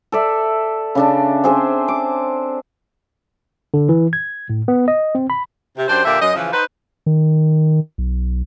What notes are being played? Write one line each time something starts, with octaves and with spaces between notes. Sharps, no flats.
A4 D5 E5
C#3 D4 A5
C4 G#4 C5 E5
D6
D3
E3
G#6
A2
B3
D#5
C4
B5
C3
F#2 D4 G4 C5
A#2 D3 A#3 G4 D5 E5
F#2 D#5
C#3 E3 F3
D#4 B4 C5
D#3
B1